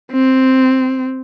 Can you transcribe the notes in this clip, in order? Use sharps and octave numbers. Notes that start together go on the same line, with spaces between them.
C4